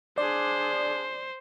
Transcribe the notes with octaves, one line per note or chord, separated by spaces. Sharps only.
D4 G#4 C5 D5